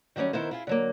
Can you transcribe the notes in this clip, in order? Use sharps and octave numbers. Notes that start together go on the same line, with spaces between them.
D#3 F#3 G3 C4 C#4
D#3 B3 E4 A#4 C5
E4 F4 G#4
D3 F#3 A#3